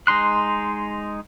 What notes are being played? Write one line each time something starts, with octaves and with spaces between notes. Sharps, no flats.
G#3 D#4 C6 F#6